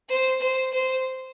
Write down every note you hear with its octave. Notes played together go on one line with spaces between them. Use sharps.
C5
C5
C5